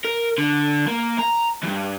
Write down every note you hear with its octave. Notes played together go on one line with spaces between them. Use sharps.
A#4
D3
A#3
A#5
E2 G2